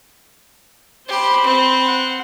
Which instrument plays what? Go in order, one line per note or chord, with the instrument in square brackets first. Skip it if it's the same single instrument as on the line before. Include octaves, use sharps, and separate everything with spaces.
[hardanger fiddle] G4 [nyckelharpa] C5 B5
[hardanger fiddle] C4
[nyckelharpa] F#5